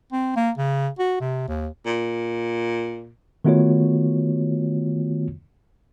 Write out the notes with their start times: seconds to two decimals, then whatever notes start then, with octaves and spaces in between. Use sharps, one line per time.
0.13 C4
0.36 A#3
0.58 C#3
0.99 F#4
1.20 C3
1.48 D#2
1.86 A#2
3.45 D#3 A3 B3 F4 F#4 C#5